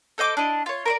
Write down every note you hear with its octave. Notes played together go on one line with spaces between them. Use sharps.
A4 C5 D#5 D6
D4 E4 D#5
F4 C#5
A#4 C5 D5